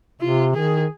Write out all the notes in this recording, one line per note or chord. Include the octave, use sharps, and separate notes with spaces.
C3 F4
D#3 G#4